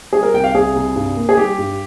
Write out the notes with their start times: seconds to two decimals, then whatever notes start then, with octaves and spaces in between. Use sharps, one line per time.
0.13 G3 G#4
0.23 A#4
0.33 C2 G5
0.44 F5
0.54 C2 G#4
0.75 C2
0.96 G2
1.16 A#3
1.29 G#4
1.37 G3 G4
1.58 G2